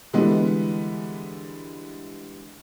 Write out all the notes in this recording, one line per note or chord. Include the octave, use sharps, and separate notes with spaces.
D3 E3 G3 G#3 B3